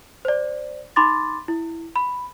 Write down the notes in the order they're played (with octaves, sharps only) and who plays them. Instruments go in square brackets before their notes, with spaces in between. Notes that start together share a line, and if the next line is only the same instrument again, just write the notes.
[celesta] C5 D5
D#4 B5 C6 D6 A6
E4
B5